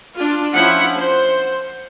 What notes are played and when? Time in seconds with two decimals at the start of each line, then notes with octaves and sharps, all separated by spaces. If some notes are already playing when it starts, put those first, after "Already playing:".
0.15 D4 F4
0.53 F3 C#4 E4 E5 F#5
0.96 C5